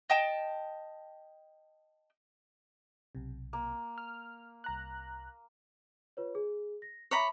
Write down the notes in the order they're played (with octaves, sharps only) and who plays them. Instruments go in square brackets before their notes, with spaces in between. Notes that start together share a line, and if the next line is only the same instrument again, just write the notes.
[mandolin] D#5 G5 A5
[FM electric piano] B1 C3
[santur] A#3
[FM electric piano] F6
C2 A#5 F#6
[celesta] F4 B4 C#5
G#4
A#6
[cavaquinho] C#5 A#5 B5 [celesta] E5 D6